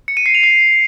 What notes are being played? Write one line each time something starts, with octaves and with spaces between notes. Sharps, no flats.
C#7
D#7
C7
F7
C7